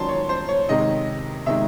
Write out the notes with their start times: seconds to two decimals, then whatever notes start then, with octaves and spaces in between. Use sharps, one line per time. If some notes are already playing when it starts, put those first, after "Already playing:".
Already playing: D#3 F#3 C#4 A5 C6
0.09 C#5
0.29 C5
0.49 C#5
0.69 C3 D#3 G#3 D#4 D#5
1.46 C3 D#3 G#3 D#4 E5